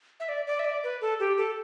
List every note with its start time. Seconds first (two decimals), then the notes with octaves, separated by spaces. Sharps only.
0.20 E5
0.29 D5
0.47 D5
0.59 E5
0.65 D5
0.84 B4
1.01 A4
1.20 G4
1.38 A4